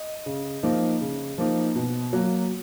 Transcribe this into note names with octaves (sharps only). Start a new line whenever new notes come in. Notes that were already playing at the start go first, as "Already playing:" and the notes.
Already playing: D#5
C#3
F3 A#3 D#4
C#3
F3 A#3 D#4
B2
F#3 A#3